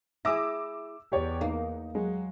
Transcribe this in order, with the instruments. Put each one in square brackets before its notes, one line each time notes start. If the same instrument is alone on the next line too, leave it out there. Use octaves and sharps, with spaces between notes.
[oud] E4 G#4 [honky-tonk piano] D6 E6 A#6
[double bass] E2 [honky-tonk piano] G4 C#5 D5
[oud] A#3 [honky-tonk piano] D#4
[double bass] F#3 [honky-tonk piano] G#3